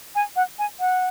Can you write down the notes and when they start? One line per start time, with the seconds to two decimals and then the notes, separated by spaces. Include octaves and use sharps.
0.15 G#5
0.36 F#5
0.59 G#5
0.80 F#5